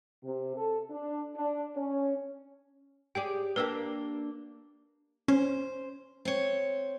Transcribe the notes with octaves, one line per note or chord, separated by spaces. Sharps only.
C3
A4
D4
D4
C#4
G4 G#4 D5 G5
A#3 D4 G4 B4 E6
C#4 C5
C4 C#5